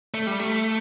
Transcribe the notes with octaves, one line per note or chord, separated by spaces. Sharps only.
A3
G3
A3